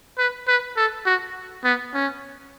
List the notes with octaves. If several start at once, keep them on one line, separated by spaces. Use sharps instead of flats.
B4
B4
A4
F#4
B3
C#4